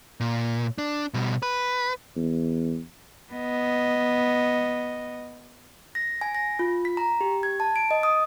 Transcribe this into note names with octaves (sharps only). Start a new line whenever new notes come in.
A#2
D4
B2 G3
B4
E2
B3 D#5
A#6
G#5
A#6
F4
B6
A#5
G4
G#6
A5
D7
D#5
D#6